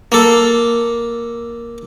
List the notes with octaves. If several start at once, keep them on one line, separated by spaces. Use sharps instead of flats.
A#3 A4